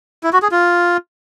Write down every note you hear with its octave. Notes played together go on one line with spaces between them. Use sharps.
E4
F#4
G#4
F4